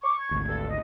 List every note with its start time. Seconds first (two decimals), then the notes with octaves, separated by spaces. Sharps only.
0.04 C#6 D6
0.19 G#6
0.31 G#1 D2
0.47 G2 A4
0.69 D#5